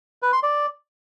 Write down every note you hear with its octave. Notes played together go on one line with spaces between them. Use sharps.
B4
C6
D5